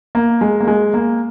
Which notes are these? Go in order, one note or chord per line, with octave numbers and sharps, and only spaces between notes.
A#3
G#3
A#3
G#3
A#3